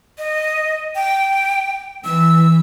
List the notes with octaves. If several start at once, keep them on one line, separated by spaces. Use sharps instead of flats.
D#5
G5
E3 E6